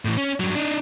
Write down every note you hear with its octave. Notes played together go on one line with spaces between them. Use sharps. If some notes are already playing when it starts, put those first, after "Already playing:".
A2 E3
C#4
G2 F#3
D4 D#4